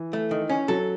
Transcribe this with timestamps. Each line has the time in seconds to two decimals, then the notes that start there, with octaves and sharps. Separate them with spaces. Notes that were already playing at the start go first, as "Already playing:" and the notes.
Already playing: E3
0.13 A3
0.31 D#3
0.49 C#4
0.68 F#3 A4